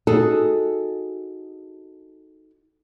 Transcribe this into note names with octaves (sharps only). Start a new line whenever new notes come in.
D#4 F#4 G#4 A4